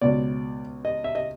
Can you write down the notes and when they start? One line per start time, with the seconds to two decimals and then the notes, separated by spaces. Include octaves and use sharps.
0.02 C#2 B2 D5
0.85 D#5
1.04 E5
1.15 D#5